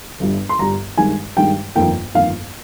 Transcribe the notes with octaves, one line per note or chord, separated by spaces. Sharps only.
G1 G2 G3
C6
G1 G2 G3 A#5
G2 D#3 G#3 G#5
G2 D#3 G#3 G5
G1 F2 D#3 A#3 G5
G1 F2 D#3 A#3 F5